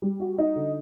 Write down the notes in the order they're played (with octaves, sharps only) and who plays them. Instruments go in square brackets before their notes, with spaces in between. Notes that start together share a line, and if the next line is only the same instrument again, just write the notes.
[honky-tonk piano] G3
F#4
D#4
D3